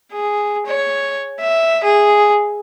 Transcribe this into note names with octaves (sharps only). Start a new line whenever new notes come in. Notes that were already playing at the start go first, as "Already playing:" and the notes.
G#4
C#5
E5
G#4